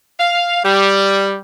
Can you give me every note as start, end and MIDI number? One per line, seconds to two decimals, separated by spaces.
0.19 0.59 77
0.64 1.38 55